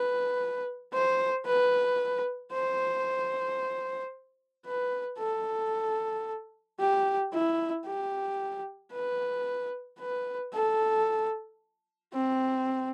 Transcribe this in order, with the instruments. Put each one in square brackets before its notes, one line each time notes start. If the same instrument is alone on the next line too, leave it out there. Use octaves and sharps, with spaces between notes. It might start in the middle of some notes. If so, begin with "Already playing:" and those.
Already playing: [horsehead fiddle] B4
C5
B4
C5
B4
A4
G4
E4
G4
B4
B4
A4
C4